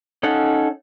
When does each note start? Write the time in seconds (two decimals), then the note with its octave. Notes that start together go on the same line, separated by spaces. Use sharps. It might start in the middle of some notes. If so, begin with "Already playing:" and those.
0.23 C#4 D#4 A4 F5 F#5